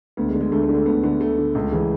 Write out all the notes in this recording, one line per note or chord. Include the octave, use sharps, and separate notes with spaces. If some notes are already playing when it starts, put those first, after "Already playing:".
D2 B3
G#3
D3
G#3
D2 A3
A3
D3
A3
D2 B3
D3 B3
D2 A3
D3
C#2
C#3 E3